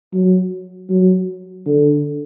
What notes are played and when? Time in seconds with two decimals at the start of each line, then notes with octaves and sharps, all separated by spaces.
0.13 F#3
0.90 F#3
1.66 D3